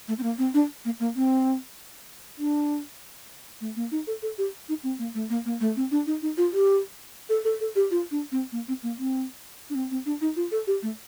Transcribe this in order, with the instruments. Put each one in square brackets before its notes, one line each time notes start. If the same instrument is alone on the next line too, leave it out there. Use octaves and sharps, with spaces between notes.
[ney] A3
C4
A#3
C4
D4
A#3
A#3
C4
D4
A3
A#3
D#4
A4
A4
G4
D#4
C4
A#3
A3
A#3
A#3
A3
C4
D4
D#4
D#4
F4
G4
A4
A4
A4
G4
F4
D4
C4
A#3
C4
A#3
C4
D4
C4
C4
D4
D#4
F4
A4
G4
A3